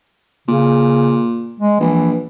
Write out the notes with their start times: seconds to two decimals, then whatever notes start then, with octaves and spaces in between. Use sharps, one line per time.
0.48 A#2 C#3
1.60 G#3
1.80 A#1 E3